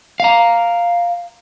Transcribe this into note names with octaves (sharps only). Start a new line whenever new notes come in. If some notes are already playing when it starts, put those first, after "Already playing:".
F5 A#5